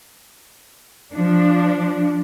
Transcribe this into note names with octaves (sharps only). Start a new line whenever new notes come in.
F3 D4